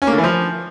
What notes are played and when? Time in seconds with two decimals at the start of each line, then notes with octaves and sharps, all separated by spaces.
0.02 C#4
0.07 A#3
0.13 D3
0.18 E3
0.24 F3